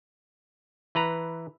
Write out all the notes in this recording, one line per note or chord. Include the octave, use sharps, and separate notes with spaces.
E3 B4 A#5